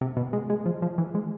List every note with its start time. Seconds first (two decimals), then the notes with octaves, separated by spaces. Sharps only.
0.01 C3
0.17 B2
0.33 G#3
0.50 G#3
0.66 F3
0.82 F3
0.98 E3
1.15 G#3